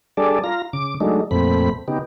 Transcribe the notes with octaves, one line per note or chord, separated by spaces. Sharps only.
G3 D4 G#4 A4 D5
F4 A#5
C#3 D6
F#3 G#3 A3 D4 D#4
F2 A#2 A3 C4 B5
C#3 B3 D#4 G4